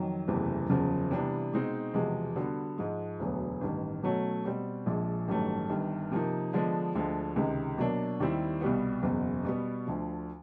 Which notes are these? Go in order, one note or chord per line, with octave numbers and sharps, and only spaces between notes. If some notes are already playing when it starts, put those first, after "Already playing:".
Already playing: F2 D#3 F#3
F#1 E2 C3 E3 A3
F#1 E2 C#3 F3
C3 E3 G3 B3 D4
B2 G#3 C4 D#4
E1 E2 C3 F3 G#3
D3 G3 B3 D4 F#4
G#2 F3 G#3
E1 D2 D3 F#3 B3
A1 G2 D#3
B2 F#3 A3 C#4 F#4
B2 G3 C4
A#1 A#2 F3 G#3
A1 G2 D#3 F#3 A3
G1 G2 D#3
C3 F3 A#3 D#4
D3 F3 G#3 B3 D4
D2 D3 F3 G#3
C#2 C3 D#3 G#3
B2 F#3 A#3 D4
D#2 D#3 G3 C4 E4
C2 B2 G3 B3
F#1 E2 B2
B2 G3 B3
D2 D3 F3